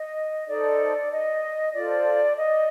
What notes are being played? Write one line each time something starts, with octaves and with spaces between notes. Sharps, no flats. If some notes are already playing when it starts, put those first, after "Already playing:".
Already playing: D#5
D#4 A4 C5 D5
D#5
F4 A4 C5 D5
D#5